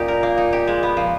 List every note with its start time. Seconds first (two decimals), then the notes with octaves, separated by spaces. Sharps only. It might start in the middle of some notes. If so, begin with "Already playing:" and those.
Already playing: A#2 C#4 D#4 G4
0.08 A#4
0.23 A#3
0.38 D#4
0.53 G4
0.68 G#3
0.83 B3
0.97 F3